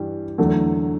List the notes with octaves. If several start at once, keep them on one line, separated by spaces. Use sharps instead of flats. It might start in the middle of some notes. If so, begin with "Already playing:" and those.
Already playing: G2 E3 G3
E2 D3 F#3 A3